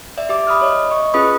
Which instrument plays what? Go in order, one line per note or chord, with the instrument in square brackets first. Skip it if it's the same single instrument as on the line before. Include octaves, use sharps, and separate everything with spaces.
[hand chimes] D5 E5
G4 D5 E5 D6
B5 D#6 F6
C#5 D#5
D#5 C#6
C#4 F4 G#4 B4 B5 D#6